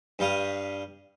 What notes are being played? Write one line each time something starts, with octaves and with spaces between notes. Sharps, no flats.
G2 G3 F5 D#6